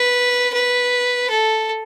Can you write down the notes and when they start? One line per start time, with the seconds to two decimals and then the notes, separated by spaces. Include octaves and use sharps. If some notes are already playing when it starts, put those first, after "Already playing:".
Already playing: B4
0.54 B4
1.30 A4